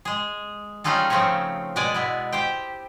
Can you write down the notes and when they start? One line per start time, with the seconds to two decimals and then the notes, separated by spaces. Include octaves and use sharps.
0.05 G#3 G#4
0.84 G3 C#4 D#4 F4 G#4 A4
1.10 C#3 F3 A3 C4 C#4 C#5
1.76 B2 G#3 D5 F#5 G#5
1.94 B2 B3 E4
2.32 G4 C5 G5